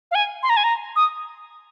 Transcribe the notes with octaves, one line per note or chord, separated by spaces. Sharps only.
F5
G#5
C6
A#5
G#5
A#5
D#6